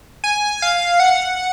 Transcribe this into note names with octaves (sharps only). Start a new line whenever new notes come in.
G#5
F5
F#5